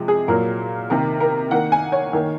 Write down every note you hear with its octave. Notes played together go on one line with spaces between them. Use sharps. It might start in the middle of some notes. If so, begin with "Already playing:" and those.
Already playing: C3 F3 G#3
G#4
A#2 F#3 A#3 A#4
C3 D#3 A#3 A#4
A#4
D#3 A#3 F#5
G#5
C#5
D#3 A#3